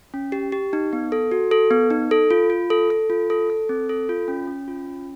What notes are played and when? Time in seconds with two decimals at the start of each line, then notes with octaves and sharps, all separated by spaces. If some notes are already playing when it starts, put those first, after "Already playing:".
0.14 C#4
0.32 G4
0.52 G4
0.73 D#4
0.93 B3
1.12 A4
1.31 F#4
1.51 A4
1.71 B3
1.90 D#4
2.11 A4
2.31 F4
2.50 F4
2.70 A4
2.90 A4
3.10 F4
3.30 A4
3.50 A4
3.69 C4
3.89 A4
4.09 F4
4.28 C#4
4.48 C#4
4.68 F4
4.88 C#4